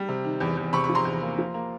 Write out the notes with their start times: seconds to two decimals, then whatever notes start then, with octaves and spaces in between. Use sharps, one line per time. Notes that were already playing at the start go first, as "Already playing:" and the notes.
Already playing: G3
0.08 C3
0.25 D#3
0.40 E2
0.57 E2
0.73 C3 B5 C#6
0.84 B5 C#6
0.89 F3
0.95 A#5 C6
1.05 E2
1.22 A#3
1.38 F3
1.54 A#3